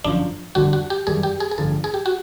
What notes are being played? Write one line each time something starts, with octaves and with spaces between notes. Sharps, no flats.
G1 F#2 C#3 F3 D4
G1 F2 D3 G3 F#4
F#4
G4
F#2 D#3 G3 G#4
G4
G#4
G#4
A1 G2 D3 F3 A4
G#4
G4
F#4